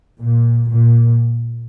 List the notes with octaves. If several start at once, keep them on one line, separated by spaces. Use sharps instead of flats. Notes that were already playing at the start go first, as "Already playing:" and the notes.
A#2
A#2